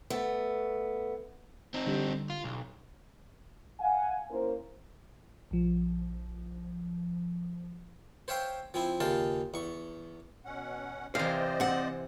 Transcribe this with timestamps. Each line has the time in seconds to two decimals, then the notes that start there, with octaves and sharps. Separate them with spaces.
0.10 A3 B3
1.74 C4 D#4
1.87 D3 G3
2.30 F4
2.44 B1
3.80 F5 F#5 G#5
4.31 A#3 C#4 E4 A#4 C5
5.51 A#1 F3
8.28 C5 C#5 E5 F5 G5 C6
8.74 F3 C4 E4
9.01 D#2 C#3 F4 F5 G5 A5
9.54 E2 C#6
10.45 B2 C#4 F#5
11.15 C3 E3 A#4 C5 D5 D#5 F5
11.60 C4 F#5